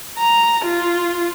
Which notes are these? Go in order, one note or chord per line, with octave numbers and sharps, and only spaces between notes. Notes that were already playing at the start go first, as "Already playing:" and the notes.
A#5
F4